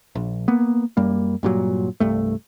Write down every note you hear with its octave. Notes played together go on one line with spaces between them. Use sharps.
A#1
A#3 B3
F#2 G3 A#3
G2 A#2 F#3
C2 G2 A3